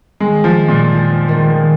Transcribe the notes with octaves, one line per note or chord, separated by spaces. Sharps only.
D#3 G#3
F3
G#3 D#4
A#2
F2
D#3 A#3